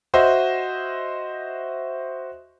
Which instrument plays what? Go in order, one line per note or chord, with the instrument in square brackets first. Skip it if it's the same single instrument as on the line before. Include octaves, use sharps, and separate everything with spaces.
[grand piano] F#4 C5 D#5 E5